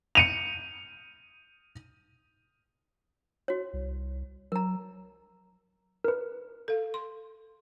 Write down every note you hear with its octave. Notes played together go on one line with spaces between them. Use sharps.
C#7 D#7 F7
F#4 C#5
C2
F#3 A#4 A#5
A#4 B4
A4 F5
C6